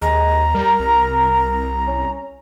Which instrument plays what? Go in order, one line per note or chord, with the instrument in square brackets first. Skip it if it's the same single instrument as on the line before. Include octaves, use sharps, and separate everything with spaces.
[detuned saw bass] D#2 [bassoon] G#3 [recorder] A#5
[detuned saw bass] G3 [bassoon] A#4
[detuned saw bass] C2
[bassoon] C#4